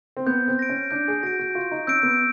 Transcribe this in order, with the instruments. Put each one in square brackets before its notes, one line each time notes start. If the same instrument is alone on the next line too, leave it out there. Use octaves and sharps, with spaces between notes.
[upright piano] C4
[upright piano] B3 [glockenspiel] G6
[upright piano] C4
[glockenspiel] A#6 D7
[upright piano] C#4
[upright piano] D4 [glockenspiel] G6
[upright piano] G#4
[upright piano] F#4 [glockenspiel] A#6 D7
[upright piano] F#4
[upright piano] F4 [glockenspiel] C#6
[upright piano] D#4
[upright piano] C#4 [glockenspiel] E6 G6 A#6 D7
[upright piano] B3